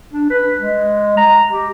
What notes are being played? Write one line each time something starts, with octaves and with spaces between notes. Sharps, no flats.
D4
B4
G#3
A#5
G4